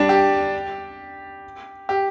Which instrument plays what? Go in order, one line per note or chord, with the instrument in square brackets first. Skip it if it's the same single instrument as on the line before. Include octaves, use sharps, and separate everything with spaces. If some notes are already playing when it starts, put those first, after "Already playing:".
Already playing: [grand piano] G3 D4
G4
G4